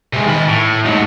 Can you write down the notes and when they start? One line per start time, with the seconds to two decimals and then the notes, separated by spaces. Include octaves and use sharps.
0.13 C3 G#3
0.26 D#3 B5
0.48 A2
0.85 G#2 F#3